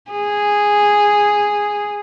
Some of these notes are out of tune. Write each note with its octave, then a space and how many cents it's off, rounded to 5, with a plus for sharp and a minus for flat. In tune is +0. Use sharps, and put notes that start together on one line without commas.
G#4 -5